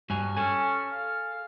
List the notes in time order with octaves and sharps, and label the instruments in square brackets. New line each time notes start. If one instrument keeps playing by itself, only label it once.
[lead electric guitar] G2 G#5 [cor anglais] F#4
[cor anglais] C#4 [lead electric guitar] A4 G#5
[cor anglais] F5